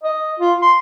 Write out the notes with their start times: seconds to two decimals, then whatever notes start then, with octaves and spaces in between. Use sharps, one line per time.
0.03 D#5
0.40 F4
0.62 C6